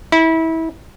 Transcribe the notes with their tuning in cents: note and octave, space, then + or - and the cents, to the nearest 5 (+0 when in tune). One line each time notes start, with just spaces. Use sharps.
E4 -25